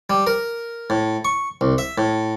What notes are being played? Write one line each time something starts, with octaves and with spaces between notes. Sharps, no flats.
G3
A#4
A2
C#6
C2
E5
A2